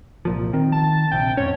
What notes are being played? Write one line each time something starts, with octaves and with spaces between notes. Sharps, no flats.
C2 A#2 F3
D#3 C4
A5
A#1 C3 G5
F2 G#2 C#4 C#5